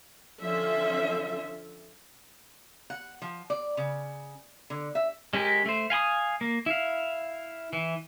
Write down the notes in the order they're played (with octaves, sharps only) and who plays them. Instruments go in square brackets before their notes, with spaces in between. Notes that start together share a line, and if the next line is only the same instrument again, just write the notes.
[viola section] D3 F3 C#4 F4 E5
[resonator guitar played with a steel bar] F#5
F3
D5
C#3
D3
E5
[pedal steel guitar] G#3 C#4 G4 A#4
A3 C5
F5 G#5 B5 D#6
A#3
E4 F5
E3